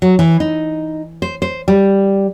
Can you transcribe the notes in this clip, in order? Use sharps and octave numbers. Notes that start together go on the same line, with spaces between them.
F#3
E3
D#4
C5
C5
G3